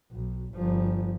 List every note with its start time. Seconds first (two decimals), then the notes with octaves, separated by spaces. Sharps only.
0.12 B1
0.54 G1 F3